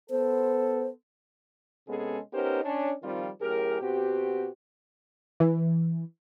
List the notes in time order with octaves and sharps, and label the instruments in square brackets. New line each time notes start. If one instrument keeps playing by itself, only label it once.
[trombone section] B3 A4 [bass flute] C5
[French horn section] C3 G#3 B3 C#4 G#4 A4
B3 C#4 D#4 G4 A#4 C5
C#4 D4 C#5
D#3 F3 G3 C4 F4
F#2 A2 G4 G#4 A#4
B2 C4 F#4 G4
[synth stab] E3